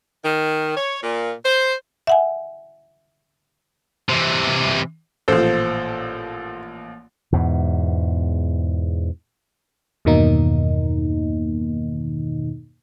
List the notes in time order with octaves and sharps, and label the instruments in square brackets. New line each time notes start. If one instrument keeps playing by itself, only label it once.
[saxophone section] D#3
C#5
A#2
C5
[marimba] E5 F#5 G#5
[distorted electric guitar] C3 E3
[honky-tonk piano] A1 A#2 F3 [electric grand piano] A4 C5
[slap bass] E2 G#2 B2
[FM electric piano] E2 G2 B2 D#3 A#3 D#4